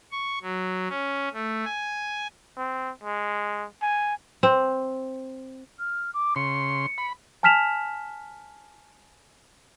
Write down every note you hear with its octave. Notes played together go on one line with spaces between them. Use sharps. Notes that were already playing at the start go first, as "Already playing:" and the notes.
C#6
F#3
C#4
A3
G#5
C4
G#3
G#5
C4
F6
D6
C#3 C6 C#7
B5
G#5 A5 F6 B6 E7 F7